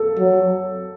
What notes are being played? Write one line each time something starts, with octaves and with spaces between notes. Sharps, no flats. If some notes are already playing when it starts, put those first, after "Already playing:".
Already playing: A4
F#3